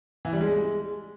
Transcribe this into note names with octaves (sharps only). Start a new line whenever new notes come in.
E3
G3
G#3